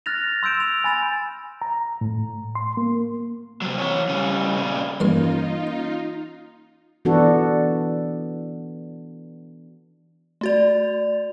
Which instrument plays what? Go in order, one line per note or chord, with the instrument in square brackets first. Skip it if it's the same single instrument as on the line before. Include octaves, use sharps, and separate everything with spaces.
[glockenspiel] F6 F#6 A6 A#6 F7
C6 E6 G6 D7 E7
F7
G#5 B5 A6 D7 F7
[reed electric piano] A#5
A2
C6
A#3
[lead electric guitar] C3 F#3
E3 C#5
C#3 G3
A#2 C#3
[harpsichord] G2 A#4 C6 [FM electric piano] E3 A#3 C#4 [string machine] D#4 F4
[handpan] E3 B3 D4 F#4 A4
[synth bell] A3 F#4 D5